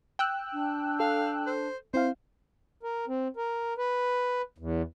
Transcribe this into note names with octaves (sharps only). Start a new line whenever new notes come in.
G5 E6 F#6
D4
A4 F5
C5
C4 E4 C5 F5
A#4
C4
A#4
B4
E2